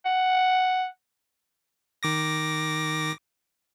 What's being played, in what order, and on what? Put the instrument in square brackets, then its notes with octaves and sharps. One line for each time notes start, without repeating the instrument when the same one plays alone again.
[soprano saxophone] F#5
[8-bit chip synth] D#3 D6 A#6